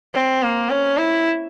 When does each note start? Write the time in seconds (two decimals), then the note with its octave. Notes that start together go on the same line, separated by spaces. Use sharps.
0.14 C4
0.43 A#3
0.70 C#4
0.98 E4